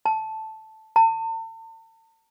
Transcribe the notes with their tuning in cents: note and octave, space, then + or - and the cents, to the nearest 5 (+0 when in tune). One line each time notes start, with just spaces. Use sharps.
A5 -5
A5 +40